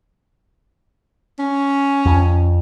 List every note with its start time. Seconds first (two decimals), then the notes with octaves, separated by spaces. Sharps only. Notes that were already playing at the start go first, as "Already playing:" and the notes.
1.39 C#4
2.06 F2